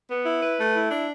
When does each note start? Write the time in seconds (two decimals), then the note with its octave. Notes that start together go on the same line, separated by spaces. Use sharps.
0.09 B3
0.25 E4
0.41 B4
0.58 A3
0.74 E4
0.90 D4